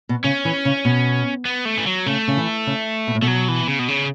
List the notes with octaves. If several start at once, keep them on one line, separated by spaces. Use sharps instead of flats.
B2
C#3 C#4
E3
C#3
B2
B3
A3
E3
F#3
C#3 A3
C#3
E3
C#3
B2
A2
B2 A3
F#3
E3
C#3
B2
C#3